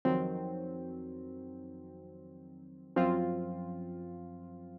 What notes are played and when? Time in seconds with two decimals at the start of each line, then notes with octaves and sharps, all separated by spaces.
0.05 F2 D#3 F#3 C4
2.96 F#2 F3 C4 F4